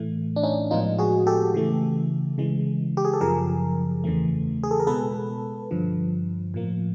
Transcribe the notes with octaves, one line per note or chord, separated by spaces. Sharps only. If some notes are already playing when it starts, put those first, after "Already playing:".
Already playing: A2 E3 A3
D4
C#4 D#4
A2 F3 G#3 B3 D#4 F4
F#4 G#4
G4 A4
C#3 E3 A3
C#3 E3 G#3
G4
G#4
A4
F#2 C#3 F3 G#4 A#4
E2 C#3 E3 A3
G#4
A4
A#4
B2 G#3 B3 A4 B4
G2 D3 F3
A2 F3 A#3